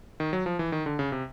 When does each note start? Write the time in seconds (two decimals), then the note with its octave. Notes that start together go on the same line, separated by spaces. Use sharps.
0.20 D#3
0.33 F#3
0.46 F3
0.59 E3
0.72 D#3
0.86 D3
0.99 C#3
1.12 C3